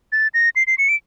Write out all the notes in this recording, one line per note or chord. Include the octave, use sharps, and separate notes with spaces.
A6
A#6
C7
C7
C#7
D7